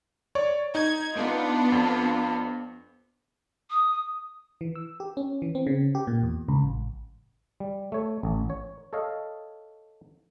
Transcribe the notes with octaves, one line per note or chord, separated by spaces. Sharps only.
C#5 D5 C#6
D#4 G#6
B3 D4 F4
F2
D#6
E3
E6
G4
C#4
E3
C4
C#3
G4
A#2
E2
C#2
A1
G3
A3 C#5
A1
C#5
A4 C#5 D#5 F5